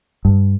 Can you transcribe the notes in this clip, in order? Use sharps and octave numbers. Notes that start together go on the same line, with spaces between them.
G2